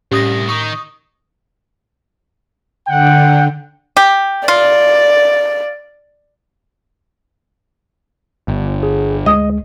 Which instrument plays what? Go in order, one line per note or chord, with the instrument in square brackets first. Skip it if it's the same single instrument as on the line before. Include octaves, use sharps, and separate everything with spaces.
[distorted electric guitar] C2 [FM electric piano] A2 C#4 [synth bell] G4 D#6 A#6
[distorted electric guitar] D#3 D#4 [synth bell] C#6 D#6
[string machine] D3 [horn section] F#5 G5
[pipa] G4
[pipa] F4 [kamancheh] D5
[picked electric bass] G1
[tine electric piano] G#4
[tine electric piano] D2 G#3 [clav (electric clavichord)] D#5